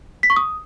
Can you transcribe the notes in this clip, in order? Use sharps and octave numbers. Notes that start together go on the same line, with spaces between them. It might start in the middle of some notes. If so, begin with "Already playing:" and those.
B6
C#6
D#6